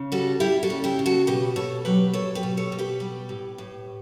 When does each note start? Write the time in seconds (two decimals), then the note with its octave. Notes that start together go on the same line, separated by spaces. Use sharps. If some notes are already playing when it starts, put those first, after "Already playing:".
Already playing: C#3
0.12 G3 F#4 A4
0.40 G3 E4 G4
0.63 F#4 A4
0.70 C#3
0.84 E4 G4
0.99 C#3
1.06 F#4 A4
1.27 B2 G4 B4
1.56 B2 A4 C#5
1.85 F#3 G4 B4
2.13 F#3 A4 C#5
2.35 G4 B4
2.43 B2
2.57 A4 C#5
2.72 B2
2.79 G4 B4
3.00 G3
3.29 A2
3.58 A2